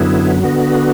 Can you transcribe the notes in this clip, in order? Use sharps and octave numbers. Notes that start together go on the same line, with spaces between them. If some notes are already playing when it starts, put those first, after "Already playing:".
Already playing: F#2 D3 F#3 B3 E4
D3 B3 F#4